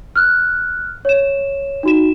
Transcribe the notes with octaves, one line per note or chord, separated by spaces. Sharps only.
F6 F#6
C#5 E7
D#4 F#4 E7